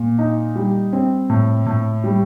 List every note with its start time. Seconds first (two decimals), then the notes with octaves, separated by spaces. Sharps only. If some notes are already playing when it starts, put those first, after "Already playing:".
Already playing: A#2
0.18 D#4
0.56 G3
0.93 C4
1.30 A2
1.66 A2
2.04 G3